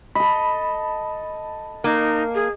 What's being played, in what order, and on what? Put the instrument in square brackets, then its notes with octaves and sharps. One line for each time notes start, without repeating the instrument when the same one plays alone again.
[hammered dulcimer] A4 D#5 [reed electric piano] B5
[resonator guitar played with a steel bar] A#3 [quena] D#4
[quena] G#4